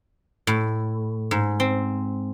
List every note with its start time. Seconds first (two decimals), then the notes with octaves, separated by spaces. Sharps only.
0.47 A2
1.31 G#2
1.60 C4